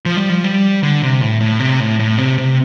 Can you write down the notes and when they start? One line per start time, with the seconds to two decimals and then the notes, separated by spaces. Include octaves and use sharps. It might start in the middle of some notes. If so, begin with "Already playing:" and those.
0.05 F3
0.18 G3
0.29 F3
0.44 G3
0.83 D3
1.03 C3
1.21 A2
1.41 A2
1.60 C3
1.80 A2
1.99 A2
2.18 C3
2.38 C3